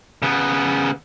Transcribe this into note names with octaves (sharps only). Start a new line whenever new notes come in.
C#3 B3